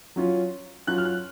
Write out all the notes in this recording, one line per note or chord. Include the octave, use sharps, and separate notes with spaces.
F#3 C#4 F4
F#3 C#4 F4 F#6
F6
F#6